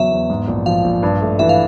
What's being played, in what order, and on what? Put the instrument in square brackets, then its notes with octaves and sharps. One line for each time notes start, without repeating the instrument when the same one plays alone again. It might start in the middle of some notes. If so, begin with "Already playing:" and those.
Already playing: [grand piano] E2 C#3 F#3 [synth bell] E5
[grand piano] E2
G#2
A#1
[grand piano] F3 [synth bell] F5
[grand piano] A#1
G2
A3
[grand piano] E3 [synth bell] E5
[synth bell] F5